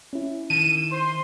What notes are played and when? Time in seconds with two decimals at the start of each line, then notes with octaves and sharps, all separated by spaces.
0.13 C#4 E4
0.50 D#3 A5 D#7
0.91 C5 C6